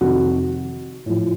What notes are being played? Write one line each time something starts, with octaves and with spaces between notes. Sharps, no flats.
F2 C3 D#3 F#4
A2 F3